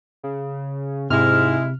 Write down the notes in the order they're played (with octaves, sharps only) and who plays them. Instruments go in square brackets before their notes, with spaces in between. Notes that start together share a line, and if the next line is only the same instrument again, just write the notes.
[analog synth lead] C#3
[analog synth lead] G#2 [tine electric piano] C3 [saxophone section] G#3 E4 [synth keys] F6